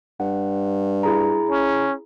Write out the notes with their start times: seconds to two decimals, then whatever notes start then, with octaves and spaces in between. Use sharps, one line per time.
0.20 G2 F#5
1.03 E4 G#4 A#5
1.50 C#4